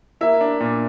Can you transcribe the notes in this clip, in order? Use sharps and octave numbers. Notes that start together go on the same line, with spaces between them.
A#3 E4 E5
D4
A#2